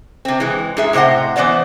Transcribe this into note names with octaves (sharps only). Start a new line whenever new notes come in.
C3 C4
E3 G#3
G#2 G#4 E5
A2 C3 C5 D#5 F#5
E3 B3 C5 D5 D#5